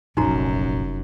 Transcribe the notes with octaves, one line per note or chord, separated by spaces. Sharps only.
F1 A#1 F#2 D#4 F#4 A#5